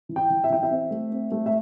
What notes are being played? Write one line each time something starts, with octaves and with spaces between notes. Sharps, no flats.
E3
G5
E3
E5
E3 G5
E5
C4
A3
C4
A3
E5